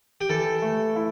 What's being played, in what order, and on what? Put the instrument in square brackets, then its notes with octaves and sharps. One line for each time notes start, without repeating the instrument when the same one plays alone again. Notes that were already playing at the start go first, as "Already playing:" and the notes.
[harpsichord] G4
[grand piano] E3 [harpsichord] A4
[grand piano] A3
E4